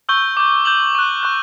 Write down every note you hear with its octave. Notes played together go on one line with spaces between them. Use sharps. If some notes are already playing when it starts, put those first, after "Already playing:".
C#6 E6 G6 G7
D6 G6
D6 G6 F#7
C#6 F#6
C#6 F#6